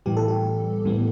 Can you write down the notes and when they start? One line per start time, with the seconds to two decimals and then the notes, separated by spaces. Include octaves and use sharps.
0.06 A2 E3 G3 B3 G4
0.17 A4
0.28 G4
0.85 A2 E3 G3 B3